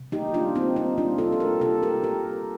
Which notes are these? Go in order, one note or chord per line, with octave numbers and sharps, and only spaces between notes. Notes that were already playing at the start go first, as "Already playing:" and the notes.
Already playing: C3
A#3 D#4 G4
G3 D4 F4
A#3 C4 D#4
A#3 C4 D#4
G3 D4 F4
C3 F4 A4
A4
A#3 G4 A#4
C3 F4 A4
C3 G4 A#4
C3 G4 A#4